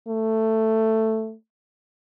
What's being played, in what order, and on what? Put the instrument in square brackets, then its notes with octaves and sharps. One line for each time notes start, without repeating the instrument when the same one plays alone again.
[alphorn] A3